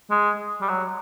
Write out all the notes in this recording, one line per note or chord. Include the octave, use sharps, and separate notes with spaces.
G#3
G3
F#3